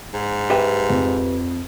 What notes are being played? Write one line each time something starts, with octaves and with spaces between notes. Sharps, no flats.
G#2
G4 B4 E5
F2